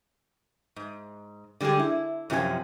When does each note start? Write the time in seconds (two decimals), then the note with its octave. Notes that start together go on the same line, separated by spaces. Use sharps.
0.76 G#2
1.61 D3 G3 G#3 G4 G#4
1.79 E4
2.30 F#2 C3 F3 G4 G#5